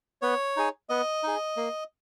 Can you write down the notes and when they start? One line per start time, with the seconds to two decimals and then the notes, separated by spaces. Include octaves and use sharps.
0.22 B3 C#5
0.57 D#4 G#4
0.89 B3 D#5
1.23 D#4 G#4
1.57 A#3